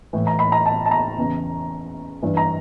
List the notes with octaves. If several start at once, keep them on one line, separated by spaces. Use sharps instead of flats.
A2 E3
A#5
B5
A#5
A5
A5
A#5
E2 C#3 E3
G2 E3
A#5